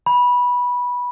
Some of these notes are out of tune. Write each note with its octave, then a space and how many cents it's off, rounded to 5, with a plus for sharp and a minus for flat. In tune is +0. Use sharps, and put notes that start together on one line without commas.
B5 -15